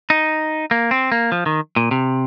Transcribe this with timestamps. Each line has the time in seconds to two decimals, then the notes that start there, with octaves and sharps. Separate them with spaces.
0.10 D#4
0.71 A#3
0.91 C4
1.12 A#3
1.32 F3
1.46 D#3
1.76 A#2
1.91 C3